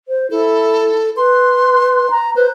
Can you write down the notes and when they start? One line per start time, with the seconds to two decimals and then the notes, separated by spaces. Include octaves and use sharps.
0.08 C5
0.31 E4 A4
1.17 B4 C6
2.10 A#5
2.36 B4 C5